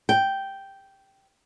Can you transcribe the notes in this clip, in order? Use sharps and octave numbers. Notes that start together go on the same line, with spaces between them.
G5